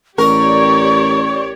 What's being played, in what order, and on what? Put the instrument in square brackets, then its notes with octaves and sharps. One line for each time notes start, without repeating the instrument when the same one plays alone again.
[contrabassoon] A1 [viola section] G4 C#5 D5 [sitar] A#4 [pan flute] C#6